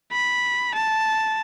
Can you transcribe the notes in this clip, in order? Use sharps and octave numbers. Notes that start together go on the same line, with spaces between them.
B5
A5